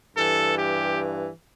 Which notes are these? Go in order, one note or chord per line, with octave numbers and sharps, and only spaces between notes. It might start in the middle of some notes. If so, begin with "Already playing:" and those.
G2 E3 A4
G4